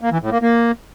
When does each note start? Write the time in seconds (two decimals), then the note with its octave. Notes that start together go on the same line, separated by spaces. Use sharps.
0.01 A#3
0.11 E3
0.22 A2
0.32 A#3
0.42 A#3